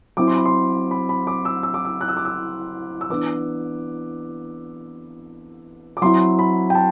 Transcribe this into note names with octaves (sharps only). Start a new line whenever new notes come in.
F#3 C4 E4 D6
C6
B5
C6
B5
B5
D6
E6
E6
D6
E6
F#6
E6
D6
E6
E6
E3 B3 D4 D6
D6
F#3 C4 E4 C6
B5
G5
A5